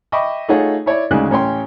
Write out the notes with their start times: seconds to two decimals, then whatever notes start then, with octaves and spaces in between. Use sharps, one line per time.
0.12 D#5 E5 G5 B5 C#6 D6
0.48 A3 D#4 F4 G#4 C#5 F#5
0.86 E4 C#5 D5
1.11 D2 C#3 G#3 D#4 F#6
1.30 A1 C#4 C#5 G5 C6